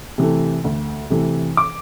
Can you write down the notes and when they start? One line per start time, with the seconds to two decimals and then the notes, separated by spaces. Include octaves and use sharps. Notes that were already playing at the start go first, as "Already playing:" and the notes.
0.18 C3 E3 A3
0.64 D2
1.10 C3 E3 A3
1.57 D6